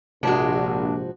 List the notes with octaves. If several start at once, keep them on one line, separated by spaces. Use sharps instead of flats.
A#1 G#2 C3 F3 G#3 D4 F#4